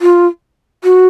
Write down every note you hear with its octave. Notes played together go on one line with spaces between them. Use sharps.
F4
F#4